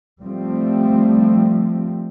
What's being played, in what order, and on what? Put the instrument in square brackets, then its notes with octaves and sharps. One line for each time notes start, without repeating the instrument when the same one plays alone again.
[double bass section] F3 G3 A3 C4